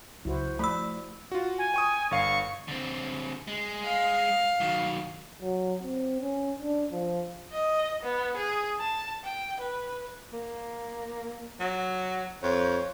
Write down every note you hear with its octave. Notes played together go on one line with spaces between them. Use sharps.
C#2 F#3 E4 F#4 C5
F3 A3 B5 E6
F4 F#4
G#5
G5 C#6 D#6
G1 F5 C#6 C7
D3 C4
G#3
F5
D#3 F#3
F#3
C4
C#4
D4
F3
D#5
B3
G#4
A5
G5
B4
A#3
F#3
F2 C#5